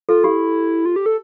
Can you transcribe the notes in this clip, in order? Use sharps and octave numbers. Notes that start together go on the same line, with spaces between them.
F4 A4
E4 G4
F4
G4
A4